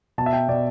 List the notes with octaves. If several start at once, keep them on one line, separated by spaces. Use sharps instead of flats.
B2 A5
E5
G5
B2 D5